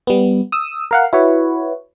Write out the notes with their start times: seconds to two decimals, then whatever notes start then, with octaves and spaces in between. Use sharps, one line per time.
0.07 G3 B3
0.52 D#6 E6
0.91 A#4 F5 F#5
1.13 E4 F#4 B4 C#5